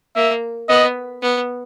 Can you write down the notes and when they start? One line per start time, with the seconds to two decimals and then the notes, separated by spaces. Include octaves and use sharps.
0.16 A#3 E5
0.68 B3 D#5
1.22 B3